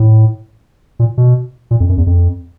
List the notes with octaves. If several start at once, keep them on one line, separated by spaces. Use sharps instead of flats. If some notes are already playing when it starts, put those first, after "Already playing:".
Already playing: A2
A#2
B2
A#2
F2
F#2
E2
F2